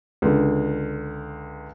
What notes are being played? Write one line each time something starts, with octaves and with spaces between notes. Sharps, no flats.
C#2 D3